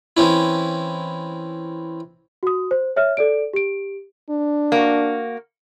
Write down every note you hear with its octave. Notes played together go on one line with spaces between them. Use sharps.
E3 C4 C#4 E4
F#4 D#6
C5
C#5 E5 F6
A4 D5 D7
G4 D7
D4
A#3 F#4